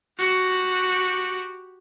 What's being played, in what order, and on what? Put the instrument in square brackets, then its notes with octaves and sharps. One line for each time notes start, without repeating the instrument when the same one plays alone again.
[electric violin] F#4 G4